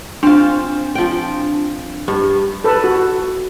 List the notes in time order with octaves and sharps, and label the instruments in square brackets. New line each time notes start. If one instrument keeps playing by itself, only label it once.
[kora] C4 F4 [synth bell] D4
[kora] F3 G5
G2
[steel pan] A4 B4
F#4